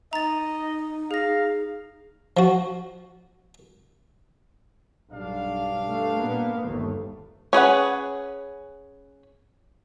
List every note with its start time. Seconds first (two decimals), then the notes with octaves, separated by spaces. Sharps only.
0.13 D#4 D#5 A#5 A6
1.11 G#4 F5 A#6
2.37 F3 F#4
5.12 B1 G2 D4 F5
5.85 A3
6.16 A#2 A#3 B3
6.65 G1 D#2 A3
7.53 C#4 G#4 B4 F#5